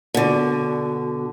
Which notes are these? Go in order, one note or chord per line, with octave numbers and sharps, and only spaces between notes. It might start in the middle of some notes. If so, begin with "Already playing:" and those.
B2 D3